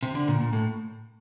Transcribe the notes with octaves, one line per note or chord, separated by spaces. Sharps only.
C3
D3
A#2
A#2
A2